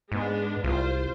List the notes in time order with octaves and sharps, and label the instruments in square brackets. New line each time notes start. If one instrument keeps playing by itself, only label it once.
[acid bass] G#2 [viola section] G#3 B3 D4
[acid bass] C2 [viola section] F4 C5